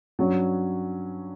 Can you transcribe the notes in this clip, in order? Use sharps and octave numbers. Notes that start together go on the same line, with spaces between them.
G2 F#3 C#4 F#4